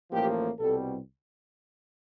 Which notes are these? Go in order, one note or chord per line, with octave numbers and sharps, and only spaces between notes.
A1 A2 F3 A#3 G4
C2 B2 G3 C4 A4